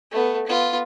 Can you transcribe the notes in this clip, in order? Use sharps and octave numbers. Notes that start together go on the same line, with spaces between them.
A3 B3
B3 F4